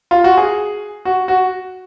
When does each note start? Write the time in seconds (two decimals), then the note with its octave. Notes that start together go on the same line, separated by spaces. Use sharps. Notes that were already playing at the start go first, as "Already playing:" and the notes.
0.11 F4
0.24 F#4
0.37 G#4
1.05 F#4
1.28 F#4